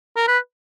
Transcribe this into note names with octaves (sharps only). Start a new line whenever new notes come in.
A#4
B4